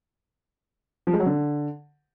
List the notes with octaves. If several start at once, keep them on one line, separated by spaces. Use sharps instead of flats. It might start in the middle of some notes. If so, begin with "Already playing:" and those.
F3
G#3
F#3
D3